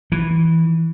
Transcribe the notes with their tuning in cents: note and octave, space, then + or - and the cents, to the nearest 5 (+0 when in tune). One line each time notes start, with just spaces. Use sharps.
E3 -10